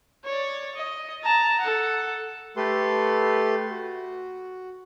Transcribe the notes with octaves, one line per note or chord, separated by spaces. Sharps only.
C#5 D5
D#5
A5 A#5
A4 F#5
A3 G4 A4 B4 C6
F#4